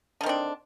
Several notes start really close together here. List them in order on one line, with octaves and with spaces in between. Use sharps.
D3 D#3 C4 D4